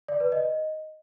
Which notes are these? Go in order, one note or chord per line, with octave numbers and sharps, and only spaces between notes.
D5
B4
D#5